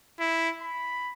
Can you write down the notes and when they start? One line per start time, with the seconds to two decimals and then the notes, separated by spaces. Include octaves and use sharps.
0.20 E4
0.62 B5